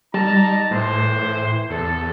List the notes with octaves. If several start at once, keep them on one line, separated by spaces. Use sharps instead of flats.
G3 D#4 A5 A#5
A2 E3 C5
E2 A4